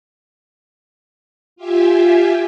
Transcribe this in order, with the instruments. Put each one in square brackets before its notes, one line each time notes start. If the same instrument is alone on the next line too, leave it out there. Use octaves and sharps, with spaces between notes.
[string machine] F4 G4 E5 G#5